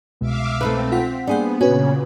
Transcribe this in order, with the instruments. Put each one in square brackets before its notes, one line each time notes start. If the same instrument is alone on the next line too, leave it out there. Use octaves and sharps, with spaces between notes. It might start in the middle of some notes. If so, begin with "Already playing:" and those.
[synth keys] C2 B2 G#3 [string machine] E5 F5 D6
[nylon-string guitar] A3 D#4 B4 [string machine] C4
[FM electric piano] F4 F#5 B6
[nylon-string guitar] G3 G#4 C5 [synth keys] A#3 D4 [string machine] B3 [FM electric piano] D5 F#5
[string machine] A#2 C#3 [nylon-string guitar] C#4 [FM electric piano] F#4 B4 [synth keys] G#6